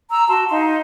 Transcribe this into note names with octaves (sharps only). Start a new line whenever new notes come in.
A#5 E6
F#4 A5 C6
D#4 F5 C6